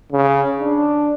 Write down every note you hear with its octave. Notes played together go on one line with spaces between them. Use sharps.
C#3
D4